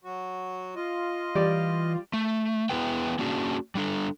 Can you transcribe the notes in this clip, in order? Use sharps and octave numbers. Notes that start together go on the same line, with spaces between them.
F#3 F#4
F4 D#5
E3 G3 G4 D5
A3
B3 E4 G#4 B4 G5
A#3 C#4 D4 F#4 G#4
G3 D4 A4